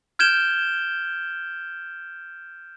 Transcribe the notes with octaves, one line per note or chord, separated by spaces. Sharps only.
F6 G6 G#6 D7 E7 G7